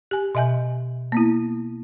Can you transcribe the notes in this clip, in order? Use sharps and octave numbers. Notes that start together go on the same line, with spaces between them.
G4 G#5
B2 D#5 E5 G#5 G6
A#3 B3 E4